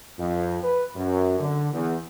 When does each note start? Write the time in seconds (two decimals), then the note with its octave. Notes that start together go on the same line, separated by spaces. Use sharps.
0.19 F2
0.63 B4
0.95 F#2
1.39 D3
1.73 E2